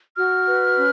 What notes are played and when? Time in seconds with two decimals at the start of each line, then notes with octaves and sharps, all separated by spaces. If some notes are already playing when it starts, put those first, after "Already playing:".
0.17 F#4 F6
0.47 B4
0.77 C#4